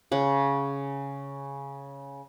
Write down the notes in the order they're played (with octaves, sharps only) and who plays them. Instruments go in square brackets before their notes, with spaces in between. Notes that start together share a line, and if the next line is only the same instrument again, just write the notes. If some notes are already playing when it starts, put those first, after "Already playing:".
[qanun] C#3 F#5